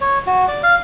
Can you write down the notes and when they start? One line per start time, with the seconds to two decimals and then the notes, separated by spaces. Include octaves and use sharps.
0.01 C#5
0.27 F#4
0.48 D5
0.63 F5